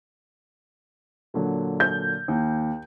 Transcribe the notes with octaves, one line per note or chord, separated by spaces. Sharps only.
A#2 D3 F#3
G6
D#2